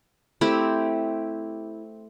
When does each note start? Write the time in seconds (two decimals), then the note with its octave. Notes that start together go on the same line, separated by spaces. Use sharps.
0.41 A3 C4 E4 G4